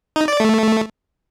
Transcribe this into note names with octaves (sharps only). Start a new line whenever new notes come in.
D#4
D5
A3